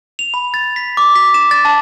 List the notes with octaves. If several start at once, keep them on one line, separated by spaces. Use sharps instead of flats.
F7
B5
A6
B6
D6
B6
E7
A6
A5